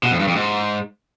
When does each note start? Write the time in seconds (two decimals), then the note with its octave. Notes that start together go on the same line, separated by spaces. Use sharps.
0.03 B2
0.11 F2
0.20 G2
0.28 F2
0.36 G#2